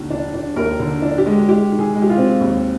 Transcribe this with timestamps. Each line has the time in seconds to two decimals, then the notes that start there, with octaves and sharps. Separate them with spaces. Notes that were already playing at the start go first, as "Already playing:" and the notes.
Already playing: D#2 D3
0.10 D4
0.34 D4
0.56 D#2 A#4
0.79 D3
1.02 D4
1.18 G4
1.26 G#3
1.49 G#3 G4
1.72 D#3
1.79 G#4
1.95 G#3
2.02 G4
2.09 F4
2.18 C4
2.41 D#2